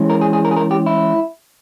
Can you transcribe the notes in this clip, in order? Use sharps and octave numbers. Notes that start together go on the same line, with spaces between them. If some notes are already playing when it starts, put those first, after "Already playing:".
Already playing: E3 G#3 C#4
A#4
G#4
G#4
A#4
G#4
A#4
G4
E4